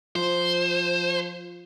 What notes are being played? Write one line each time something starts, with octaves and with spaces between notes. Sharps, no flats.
F3 C5